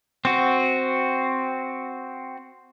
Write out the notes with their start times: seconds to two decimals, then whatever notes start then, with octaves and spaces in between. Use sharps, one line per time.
0.25 C4 F#4